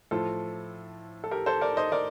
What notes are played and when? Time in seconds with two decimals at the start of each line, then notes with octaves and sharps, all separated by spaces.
0.11 A2 F3 F4 A4
1.24 A4
1.31 G4 A#4
1.46 A4 C5
1.61 A#4 D5
1.77 C5 D#5
1.92 A#4 D5